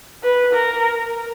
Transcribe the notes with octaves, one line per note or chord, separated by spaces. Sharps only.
B4
A#4